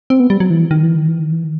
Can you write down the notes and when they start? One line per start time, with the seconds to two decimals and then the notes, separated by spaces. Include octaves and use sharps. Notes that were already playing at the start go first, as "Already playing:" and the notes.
0.10 C4
0.20 B3
0.30 G3
0.40 F#3
0.50 E3
0.71 D#3
0.83 E3
0.95 D#3
1.07 E3
1.19 D#3
1.32 E3
1.44 D#3